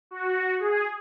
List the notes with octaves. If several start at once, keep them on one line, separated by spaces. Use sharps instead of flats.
F#4
G#4